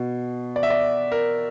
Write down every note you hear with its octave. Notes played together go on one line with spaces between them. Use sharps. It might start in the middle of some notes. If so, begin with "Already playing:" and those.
Already playing: B2
D5
E5
D5
A#4